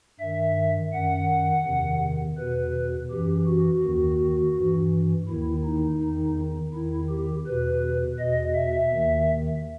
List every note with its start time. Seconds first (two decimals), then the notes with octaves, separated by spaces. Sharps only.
0.20 G2 D#3 E5
0.93 F#2 D#3 F#5
1.66 E2 C3 D#3
2.38 E2 B2 B4
3.11 F#2 E3 G4
3.47 F#4
3.83 D#2 D#3
4.56 G2 E3
5.28 D#2 D#3 E4
5.64 D#4
6.01 E2 D#3
6.74 E2 D#3 E4
7.10 G4
7.46 E2 B2 B4
8.18 E2 B2 D#5
8.55 E5
8.91 D#2 D#3